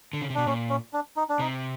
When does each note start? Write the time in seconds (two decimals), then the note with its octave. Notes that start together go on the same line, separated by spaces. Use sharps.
0.13 D3
0.22 C#3
0.30 C3
0.35 B2 D4
0.46 A#2 C#4
0.69 C#4
0.93 D4
1.17 D#4
1.29 D4
1.39 C3 D#4